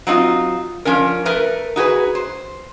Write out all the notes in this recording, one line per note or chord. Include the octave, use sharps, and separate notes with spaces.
F#3 C4 D#4 F4
F3 C#4 D4 A#4
A3 A#4 B4
D#4 F#4 G#4 B4
C5